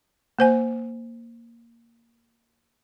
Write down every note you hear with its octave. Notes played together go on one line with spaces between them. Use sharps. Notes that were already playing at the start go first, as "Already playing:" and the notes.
A#3 C5 G#5